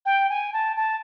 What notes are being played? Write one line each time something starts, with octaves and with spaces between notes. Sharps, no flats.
G5
G#5
A5
A5